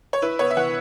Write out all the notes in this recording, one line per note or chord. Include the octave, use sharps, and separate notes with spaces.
C#5
E4 B4
B3 C#5
E5
E3 F#5